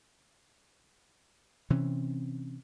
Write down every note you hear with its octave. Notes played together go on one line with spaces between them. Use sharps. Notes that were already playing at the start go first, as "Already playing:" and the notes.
C3 E3 C4 C#4